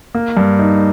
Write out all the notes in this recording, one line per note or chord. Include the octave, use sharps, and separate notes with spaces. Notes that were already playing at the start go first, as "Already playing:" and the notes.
A#3
G2
D#4